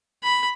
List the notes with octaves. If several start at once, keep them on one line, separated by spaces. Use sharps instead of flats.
B5